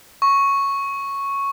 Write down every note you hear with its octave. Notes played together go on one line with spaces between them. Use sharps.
C#6